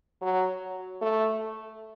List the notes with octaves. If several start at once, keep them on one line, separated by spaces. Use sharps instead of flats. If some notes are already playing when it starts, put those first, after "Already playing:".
F#3
A3